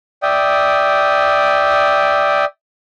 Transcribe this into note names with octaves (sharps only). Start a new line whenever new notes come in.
D5 E5 G5 D#6